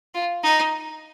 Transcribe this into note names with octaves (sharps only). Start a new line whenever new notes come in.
F4
D#4